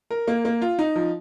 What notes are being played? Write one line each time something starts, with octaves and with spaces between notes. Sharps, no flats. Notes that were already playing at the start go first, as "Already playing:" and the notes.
A#4
A#3
A#3
F4
D#4
F3